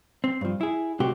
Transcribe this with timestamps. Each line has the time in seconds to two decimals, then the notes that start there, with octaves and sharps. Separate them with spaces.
0.24 C4
0.41 G2 F3
0.61 E4 G#4
1.00 C#2 C3 A3 F#4 G4 C5